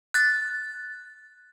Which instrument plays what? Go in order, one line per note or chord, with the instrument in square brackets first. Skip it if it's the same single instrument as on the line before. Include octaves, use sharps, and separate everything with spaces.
[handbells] F#6 A6